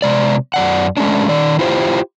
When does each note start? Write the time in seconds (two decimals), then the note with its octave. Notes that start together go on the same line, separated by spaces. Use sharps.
0.02 C3 G#3 D5
0.54 F#2 D5 F#5
0.97 G#3 A3 C#4 D4
1.29 D#3 D5
1.59 E4 F4 G4 C5